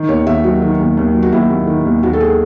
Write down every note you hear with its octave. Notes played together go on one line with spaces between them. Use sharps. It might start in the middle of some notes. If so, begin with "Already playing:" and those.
Already playing: D#3
D#2 C#5
D#2 E5
F#3 F#4
D#3
D#2
D#2
F#3
F#4
D#2 E4
D#2
D#3
D#2
D#2 F#4
A4
G#4